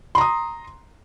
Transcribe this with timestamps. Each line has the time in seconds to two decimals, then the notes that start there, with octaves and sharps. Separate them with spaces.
0.15 C6
0.18 A#5
0.21 D#6